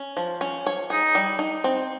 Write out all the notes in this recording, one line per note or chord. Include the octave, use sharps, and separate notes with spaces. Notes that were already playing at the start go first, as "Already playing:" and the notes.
Already playing: C#4
F3
C#4
C#5
D#4 G#4
G3
D#4
C4